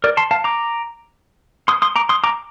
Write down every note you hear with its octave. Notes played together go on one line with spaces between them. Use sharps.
A#4 D5
A5 C6
F5 A5
A#5 D6
C6 D#6
C6 D#6
A#5 D6
C6 D#6
A#5 D6